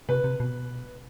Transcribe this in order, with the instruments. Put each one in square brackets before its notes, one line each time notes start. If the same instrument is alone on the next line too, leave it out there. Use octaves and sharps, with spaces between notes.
[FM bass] C3 [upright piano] B4
[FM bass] C3
B2